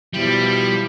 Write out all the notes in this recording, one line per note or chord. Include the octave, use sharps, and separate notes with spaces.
B2 F3 G3 E4